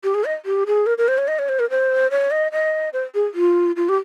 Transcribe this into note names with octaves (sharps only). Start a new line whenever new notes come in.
G4
G#4
D#5
G4
G#4
A#4
A#4
C5
C#5
D#5
C#5
C5
A#4
C5
C#5
D#5
D#5
C5
G#4
F4
F4
G4